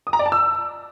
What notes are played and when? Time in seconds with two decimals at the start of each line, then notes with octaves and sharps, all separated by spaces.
0.07 D#6
0.13 A#5
0.19 D5
0.26 A5
0.32 E6